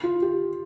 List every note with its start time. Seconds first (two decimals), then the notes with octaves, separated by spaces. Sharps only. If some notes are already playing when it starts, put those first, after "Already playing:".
0.03 F4
0.22 G4